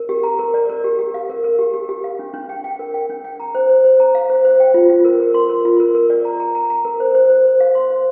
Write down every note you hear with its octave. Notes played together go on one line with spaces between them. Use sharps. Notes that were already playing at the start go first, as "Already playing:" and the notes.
Already playing: A#4
G4
A#5
A#4
D5
A#4
G4
G4
F5
A#4
A#4
G4
G4
G4
F5
D4
D4
G5
G5
A#4
G5
D4
G5
A#5
C5
C5
C5
A#5
F5
C5
C5
G5
F4
F4
A#4
A#4
C6
A#4
F4
A#4
A#4
D5
A#5
A#5
A#5
A#5
A#4
C5
C5
C5
C5
F5
C6
C5